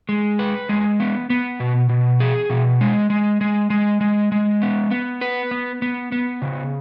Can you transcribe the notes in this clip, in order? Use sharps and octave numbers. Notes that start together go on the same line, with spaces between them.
G#3
B4
G#3
B3
B3
B2
B2
G#4
B2
G#3
G#3
G#3
G#3
G#3
G#3
B3
B3
B4
B3
B3
B3
C#3